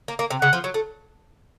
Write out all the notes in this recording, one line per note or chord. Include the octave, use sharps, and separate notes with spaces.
A#3
A#3
C3
C#3 F#5
F3
F#3
A3